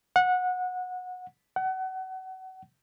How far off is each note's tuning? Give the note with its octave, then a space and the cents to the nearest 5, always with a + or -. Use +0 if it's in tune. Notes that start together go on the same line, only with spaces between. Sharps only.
F#5 -20
F#5 +30